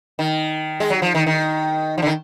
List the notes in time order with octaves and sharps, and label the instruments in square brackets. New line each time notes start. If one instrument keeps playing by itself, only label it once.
[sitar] D#3
G#3
F#3
F3
D#3
D#3
F3
D3
D#3